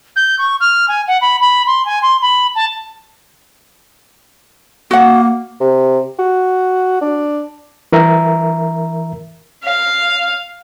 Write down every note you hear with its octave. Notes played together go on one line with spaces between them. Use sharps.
G6
C#6
F6
G#5
F#5
B5
B5
C6
G#5
C6
B5
A5
A#3 F#4 F#5
C3
F#4
D4
E3 A#4 E5 A#5
F5